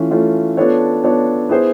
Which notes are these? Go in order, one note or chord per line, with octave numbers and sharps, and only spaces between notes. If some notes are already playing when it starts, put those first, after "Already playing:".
Already playing: E3 A3 C#4 F4
E3 A3 C#4 F4
B3 D4 F4 A4 C#5
B3 D4 F4 A4 C#5
B3 E4 G#4 C5